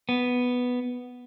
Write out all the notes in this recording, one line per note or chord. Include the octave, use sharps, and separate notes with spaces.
B3